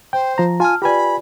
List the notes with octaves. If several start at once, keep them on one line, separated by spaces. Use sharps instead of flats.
C5 G5
F3 A#5
F4 G#5 A5 F6
F4 G4 B4 D5 G#5 B5